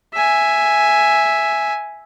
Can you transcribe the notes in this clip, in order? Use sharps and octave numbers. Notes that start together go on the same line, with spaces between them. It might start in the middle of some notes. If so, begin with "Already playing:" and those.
E5 G#5